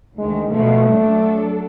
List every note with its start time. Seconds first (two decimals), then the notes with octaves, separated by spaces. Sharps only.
0.18 D2 D#3 G#3
0.50 B2 F3 A3
0.91 F#3 D4 A4